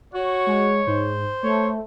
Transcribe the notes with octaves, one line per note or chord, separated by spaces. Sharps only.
F#4 C#5
G#3
G#2 C5
A3 C#5